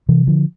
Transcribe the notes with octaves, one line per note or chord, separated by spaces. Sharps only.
C3 E3
D3 F3